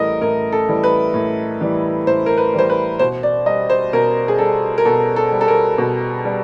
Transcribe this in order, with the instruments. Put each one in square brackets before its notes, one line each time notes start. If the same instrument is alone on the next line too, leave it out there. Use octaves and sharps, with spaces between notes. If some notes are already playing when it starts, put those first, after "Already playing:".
Already playing: [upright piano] A2 E3 G3 A4 A#4 D#5
A2 A#4
A4
E3 G3
B4
A2
E3 G3
A2 C5
A#4
B4
E3 G3 C5
B4
B2 C5
D5
G3 D#5
C5
B2 A#4
G#4
G3 A4
A#4
B2 A4
A4
G3
A4
A#4
B2
G3